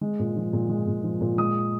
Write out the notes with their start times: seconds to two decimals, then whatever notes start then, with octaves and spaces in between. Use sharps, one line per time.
0.01 G#3
0.19 A#2
0.36 F3
0.53 A#2
0.69 G#3
0.87 A#2
1.04 F3
1.21 A#2
1.38 G#3 D#6